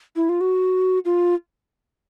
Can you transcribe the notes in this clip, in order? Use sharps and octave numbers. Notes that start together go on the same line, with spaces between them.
E4
F4
F#4
F4